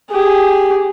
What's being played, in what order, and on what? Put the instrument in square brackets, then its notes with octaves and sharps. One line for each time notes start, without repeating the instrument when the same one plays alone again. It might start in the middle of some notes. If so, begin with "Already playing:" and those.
[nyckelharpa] G4 G#4